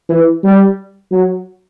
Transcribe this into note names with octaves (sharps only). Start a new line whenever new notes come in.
E3
G3
F#3